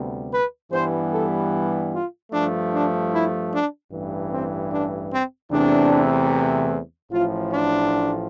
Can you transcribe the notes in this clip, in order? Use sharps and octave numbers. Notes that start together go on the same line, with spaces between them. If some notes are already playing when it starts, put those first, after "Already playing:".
Already playing: D2 C3 G3 B3
B4
G2 E3 G3 B3 C5
A4
F4
G2 F3 A3 D4
D4
E4
D4
A1 G2 E3
C4
D4
C4
E2 C3 E3 A3 C4 D4
A1 A2 F3 F4
D4